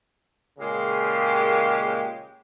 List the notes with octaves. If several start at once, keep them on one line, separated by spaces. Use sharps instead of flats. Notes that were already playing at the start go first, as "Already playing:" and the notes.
A#2 C#3 G#3 A#3 G4